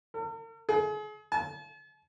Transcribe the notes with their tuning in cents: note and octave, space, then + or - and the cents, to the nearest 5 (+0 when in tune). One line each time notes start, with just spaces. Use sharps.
A#4 -45
G#4 +35
A5 -45